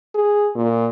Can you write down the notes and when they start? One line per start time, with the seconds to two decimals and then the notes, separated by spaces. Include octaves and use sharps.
0.15 G#4
0.55 A#2